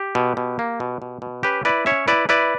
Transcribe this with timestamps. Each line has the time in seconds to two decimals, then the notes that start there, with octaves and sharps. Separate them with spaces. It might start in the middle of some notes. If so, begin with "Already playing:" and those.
Already playing: G4
0.15 B2
0.37 B2
0.59 A#3
0.80 B2
1.02 B2
1.22 B2
1.43 C#4 G4 B4
1.65 E4 B4 D5
1.86 C#4 C#5 E5
2.08 E4 B4 D5
2.29 E4 B4 D5